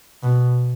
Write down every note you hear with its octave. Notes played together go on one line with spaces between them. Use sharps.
B2